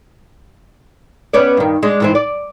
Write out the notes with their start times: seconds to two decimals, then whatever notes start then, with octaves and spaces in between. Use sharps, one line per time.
1.33 B3 C#4 D5
1.57 G2 D#3
1.83 G#3 D4
2.00 G#2 E3 C4
2.15 D5